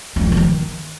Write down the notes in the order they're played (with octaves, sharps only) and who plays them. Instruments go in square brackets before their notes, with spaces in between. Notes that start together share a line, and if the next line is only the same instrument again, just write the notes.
[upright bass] C#4
G3
B3
D4
D#3